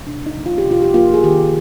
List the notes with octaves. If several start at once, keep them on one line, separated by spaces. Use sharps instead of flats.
C3 D4
D#4
F3 A#3
F4
G4
C3
F4
G4
F3 A#3 F4
G#4
D#3 G4